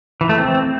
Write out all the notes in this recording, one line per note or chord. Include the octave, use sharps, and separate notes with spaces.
E3
A3
C4